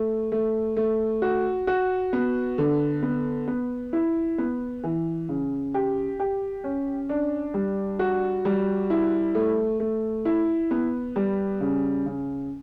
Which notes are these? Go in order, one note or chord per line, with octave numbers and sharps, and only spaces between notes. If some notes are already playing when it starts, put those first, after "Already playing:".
Already playing: A3
A3
A3
F#4
F#4
B3
D3
B3
B3
E4
B3
E3
C#3
G4
G4
C#4
D4
G3
F#4
G3
E4
A3
A3
E4
B3
G3
C#3
C#3